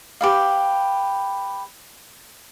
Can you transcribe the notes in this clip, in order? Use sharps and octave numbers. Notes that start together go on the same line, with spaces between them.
G4 B4 F5